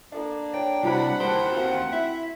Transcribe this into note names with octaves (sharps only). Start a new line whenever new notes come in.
A#3 D4 A4 D#5
C#5 G5
C3 G3 E4 F#4 C5 F#5 B5
A#3 G4 A#4 C5 A5
C4 F#4 A#4 F5 F#5
E4 E5